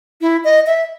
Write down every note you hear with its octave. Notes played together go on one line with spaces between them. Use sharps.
E4
D#5
E5